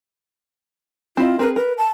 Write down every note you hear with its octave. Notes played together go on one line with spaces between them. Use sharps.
C4 E4 F4 D#5
C4 G#4 A#4 B4
A#4 B4
A5